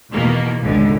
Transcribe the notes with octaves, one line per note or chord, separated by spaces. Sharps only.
E2 B2 D#3 A#3
G#1 C#2 D3